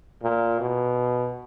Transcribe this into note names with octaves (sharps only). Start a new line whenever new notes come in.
A#2
B2